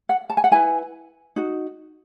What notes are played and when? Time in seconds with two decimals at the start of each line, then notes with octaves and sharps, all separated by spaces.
0.09 F#5
0.30 A5
0.37 G#5
0.44 F#5
0.51 E4 B4 G#5
1.36 D#4 F#4